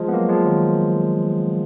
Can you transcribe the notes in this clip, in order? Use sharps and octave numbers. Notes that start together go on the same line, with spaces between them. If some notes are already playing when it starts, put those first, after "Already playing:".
Already playing: F3 G#3
B3
F#3 A#3
F3 G#3
D#3 F#3